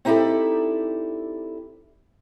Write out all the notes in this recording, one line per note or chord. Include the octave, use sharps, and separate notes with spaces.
C4 D#4 E4 G4 A4 D5